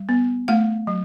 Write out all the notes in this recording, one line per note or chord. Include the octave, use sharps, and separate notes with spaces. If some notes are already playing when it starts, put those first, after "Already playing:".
Already playing: G3
B3
A3 F5
F#3